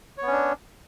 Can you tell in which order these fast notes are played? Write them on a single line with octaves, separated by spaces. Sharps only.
C#5 B3 C#4 D4